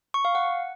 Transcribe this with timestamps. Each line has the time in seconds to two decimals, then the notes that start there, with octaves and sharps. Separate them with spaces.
0.14 C#6
0.25 F5
0.35 F#5